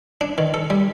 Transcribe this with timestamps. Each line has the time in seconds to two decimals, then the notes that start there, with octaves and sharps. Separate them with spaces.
0.21 D4
0.38 D#3
0.54 A4
0.70 G3